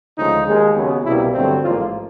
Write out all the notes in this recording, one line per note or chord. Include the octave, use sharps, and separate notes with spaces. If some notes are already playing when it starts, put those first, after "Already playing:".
D2 C#3 F3 G#3 D#4
D#2 D#3 G#3
D#2 C#3 F#3 B3
C2 B2 G3 A#3 E4
G2 D3 F#3 A3 C4
A1 G#2 F3 A#3 F4